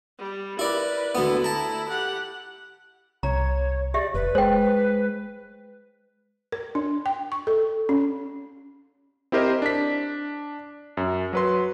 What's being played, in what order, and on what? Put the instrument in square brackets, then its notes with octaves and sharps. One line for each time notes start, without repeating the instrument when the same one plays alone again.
[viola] G3
[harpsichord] E4 D5 [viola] A#4 B4
[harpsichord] D2 B3 [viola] E4 A4
[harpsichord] A5 A#5
[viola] G4 F#5
[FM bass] C2 [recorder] C#5 [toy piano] A#5
[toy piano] G4 E5 [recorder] D5
[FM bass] F1 [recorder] B4
[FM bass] G#3 [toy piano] C5 G5
[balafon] A#4
D4
G5
C#6
A4
C#4
[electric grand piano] C4 E4 G4 A#4 C5 D#5
D4 B6
F#2
F#3 B4 C6